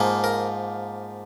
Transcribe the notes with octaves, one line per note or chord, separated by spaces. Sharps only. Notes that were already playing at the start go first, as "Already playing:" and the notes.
Already playing: G#2 F3 A#3
A#4